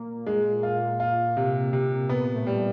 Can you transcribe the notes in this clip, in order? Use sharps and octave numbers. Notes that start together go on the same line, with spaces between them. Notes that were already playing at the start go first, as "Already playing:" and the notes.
Already playing: A#2 A#3
G#3
F4
F4
C3
C3
A#2 A#3 B3
A2 A3
G3